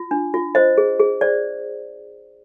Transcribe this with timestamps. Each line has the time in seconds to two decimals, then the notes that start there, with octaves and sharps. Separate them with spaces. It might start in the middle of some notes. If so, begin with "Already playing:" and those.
Already playing: F4
0.11 D4
0.34 F4
0.55 C5 D#5
0.78 G#4
1.00 G#4
1.21 C5 D5